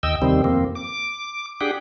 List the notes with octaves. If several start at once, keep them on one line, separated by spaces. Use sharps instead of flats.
D#2 D#5 G5 E6
D#2 C3 D#3 G3 C4
F2 A#3 C4
D6
D4 G4 G#4 F#5 G5